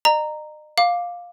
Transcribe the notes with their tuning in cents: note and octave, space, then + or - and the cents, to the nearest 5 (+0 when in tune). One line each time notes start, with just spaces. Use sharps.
D#5 -40 A#5 -5
F5 +10 D6 +0